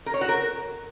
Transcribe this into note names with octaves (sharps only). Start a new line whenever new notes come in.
A#4
C#5
F#4
A#4